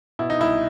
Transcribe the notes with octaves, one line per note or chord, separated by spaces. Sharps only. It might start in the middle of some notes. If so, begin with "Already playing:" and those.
B2 E4
D#4
C2 E4